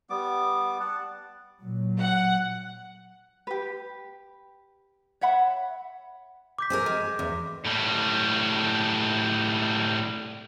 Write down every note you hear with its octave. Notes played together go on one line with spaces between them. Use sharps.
G3 B3 D6
F#5 A5
A#2 F#3
F#5
G4 B4
C#5 E5 F#5 B5
D6 G6 B6
C4 G#4 A#4
G#3
E2
A2 G3